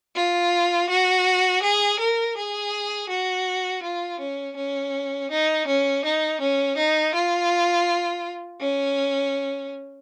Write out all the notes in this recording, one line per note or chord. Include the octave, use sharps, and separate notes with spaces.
F4
F#4
G#4
A#4
G#4
F#4
F4
C#4
C#4
D#4
C#4
D#4
C#4
D#4
F4
C#4